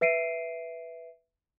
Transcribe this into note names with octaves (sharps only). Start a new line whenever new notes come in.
B4 E5 C7 D7 D#7